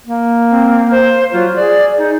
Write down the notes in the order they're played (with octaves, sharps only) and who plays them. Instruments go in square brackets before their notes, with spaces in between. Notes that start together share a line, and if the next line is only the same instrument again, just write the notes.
[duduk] A#3
[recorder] C4
C5
[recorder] F#3 [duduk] F4
[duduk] G#4 [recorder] D5
[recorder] D#4